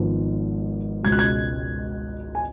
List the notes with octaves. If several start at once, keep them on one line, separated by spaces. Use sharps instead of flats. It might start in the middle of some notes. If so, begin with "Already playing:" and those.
Already playing: G#1 G#2 F3 B3
C#2 B2 G#3 G#6
F#6
G#6
G#5